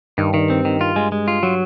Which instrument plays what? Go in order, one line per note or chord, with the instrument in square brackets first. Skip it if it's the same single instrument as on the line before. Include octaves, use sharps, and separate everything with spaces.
[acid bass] G2 [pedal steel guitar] D#3
[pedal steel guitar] D#3
C4
D#3
F4
G#3
G#3
F4
F#3